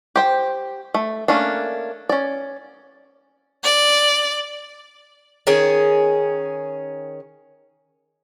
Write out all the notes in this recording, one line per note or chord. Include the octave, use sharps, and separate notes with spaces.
G4 C5 G5
A3
A3 A#3 C#4 D4
C#4 D5
D5
D#3 C#4 G#4